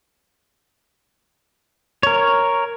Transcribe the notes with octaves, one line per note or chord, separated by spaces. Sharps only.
A#4 C#5